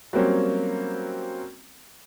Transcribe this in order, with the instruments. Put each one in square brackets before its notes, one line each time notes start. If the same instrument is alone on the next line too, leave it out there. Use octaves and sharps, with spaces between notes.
[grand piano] F#3 G3 A#3 C4 C#4